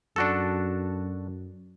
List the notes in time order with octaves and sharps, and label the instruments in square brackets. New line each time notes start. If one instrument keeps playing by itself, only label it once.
[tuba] F#2 [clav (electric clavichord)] D4 F#4 A4